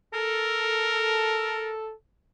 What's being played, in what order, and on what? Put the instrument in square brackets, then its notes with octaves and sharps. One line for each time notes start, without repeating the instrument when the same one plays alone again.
[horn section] A4 [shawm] A#4